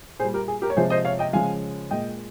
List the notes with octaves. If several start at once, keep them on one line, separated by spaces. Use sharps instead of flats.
A#2 G3 G#4 C5
G4 A#4
G#4
G4 A#4
C#5
C3 F3 G#3 G#4 C5
C5 D#5
C#5 F5
D#5 G5
C#3 F3 G#3 F5 G#5
A#2 G#3 D#5 G5